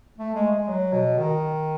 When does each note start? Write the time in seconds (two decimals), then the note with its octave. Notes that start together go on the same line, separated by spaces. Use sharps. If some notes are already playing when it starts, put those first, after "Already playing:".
0.18 A3
0.35 G#3
0.51 G#3
0.68 F#3
0.93 B2
1.18 D#3